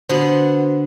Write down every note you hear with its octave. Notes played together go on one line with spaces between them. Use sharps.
D3 B3 F#4 C5